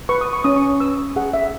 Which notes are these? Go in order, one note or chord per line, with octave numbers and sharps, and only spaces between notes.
B4 C#6
D#6
C#6
C#4 D#6
C#6
B4 E6
D#6
G#4 F#5
E5